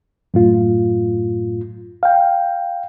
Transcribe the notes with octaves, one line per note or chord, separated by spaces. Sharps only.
F#2 A2 F4
F5 G5